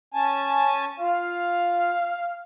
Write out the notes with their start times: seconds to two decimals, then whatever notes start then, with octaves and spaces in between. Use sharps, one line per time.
0.14 C#4 G#5 A5
0.99 F4 F5